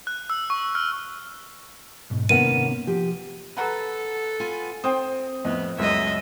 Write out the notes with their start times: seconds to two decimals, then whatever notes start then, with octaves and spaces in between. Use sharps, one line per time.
0.07 F#6
0.30 E6
0.50 C#6
0.75 F6
2.10 B1 G#2 B2
2.29 C3 D#3 A#3 B3 C#4 F#5 D#7
2.87 F3 G4
3.57 A4 B4 F#5 A#5
4.40 B3 F4 G#5
4.84 C4 G5 C6 D#6
5.45 F2 A2 B3 D#5
5.78 C#2 F#2 G#3 D#5 E5